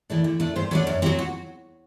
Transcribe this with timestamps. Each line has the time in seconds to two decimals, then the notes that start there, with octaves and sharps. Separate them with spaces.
0.10 E3 A3 D4
0.24 D3
0.40 A3 D4
0.56 G2 C5
0.71 F#3 A3 D4 B4
0.87 F#2 A4
1.02 C4 G4
1.06 F#3
1.19 F#4